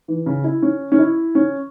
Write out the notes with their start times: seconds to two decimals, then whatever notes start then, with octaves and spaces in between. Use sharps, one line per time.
0.08 E3
0.26 C#3
0.44 E4
0.62 C#4
0.92 C#4
0.99 E4
1.35 C#4